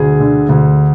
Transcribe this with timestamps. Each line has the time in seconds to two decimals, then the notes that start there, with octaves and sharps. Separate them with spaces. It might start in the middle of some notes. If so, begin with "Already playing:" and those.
Already playing: D2 G#4
0.20 D3
0.49 D2